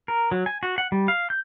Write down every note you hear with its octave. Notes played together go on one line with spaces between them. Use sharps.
A#4
F#3
G#5
F#4
F#5
G3
F5
G6